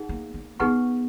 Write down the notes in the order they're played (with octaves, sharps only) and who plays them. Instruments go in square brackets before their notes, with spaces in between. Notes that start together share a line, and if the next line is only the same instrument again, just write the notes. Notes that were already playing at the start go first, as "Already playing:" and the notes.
Already playing: [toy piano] D#4 G#4 F#5
[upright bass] A#3
A#3
[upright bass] B3 [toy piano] D#4 G#4 B4 F#5 C#6